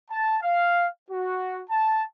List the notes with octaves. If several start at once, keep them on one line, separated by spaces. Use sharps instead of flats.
A5
F5
F#4
A5